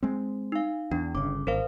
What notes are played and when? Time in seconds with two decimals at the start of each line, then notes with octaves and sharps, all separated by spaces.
0.03 G#3 C4
0.52 D#4 F5
0.91 E2 D4
1.15 G1 C#3 D6
1.47 G#1 A#4 C5 F5